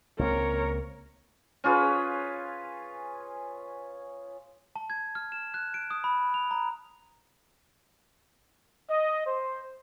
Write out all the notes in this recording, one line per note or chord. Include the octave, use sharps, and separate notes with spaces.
C#2 A#3 C4 A#4 C#5
C#4 F4 G#4 B4
A5
G#6
F6
E7
F#6
D7
D#6
B5
F7
A#5
D#5
C5